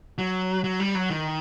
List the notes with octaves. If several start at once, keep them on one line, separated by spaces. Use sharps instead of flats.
F#3
F#3
G3
F#3
D#3